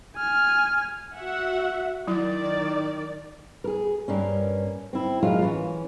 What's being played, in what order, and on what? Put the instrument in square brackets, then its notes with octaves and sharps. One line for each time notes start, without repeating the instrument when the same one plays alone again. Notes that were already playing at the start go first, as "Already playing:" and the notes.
[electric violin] G#5 F6
[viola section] F#4 E5 F#5
[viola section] D#3 D5 [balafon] F#3 E4
[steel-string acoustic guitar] G#4 A#4
G2 A#3 C#4
C4 E4
F#2 F#3 G#3 A#3 C#4 F4
E3 C#4